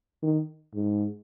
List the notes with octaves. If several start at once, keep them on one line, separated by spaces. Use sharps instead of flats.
D#3
G#2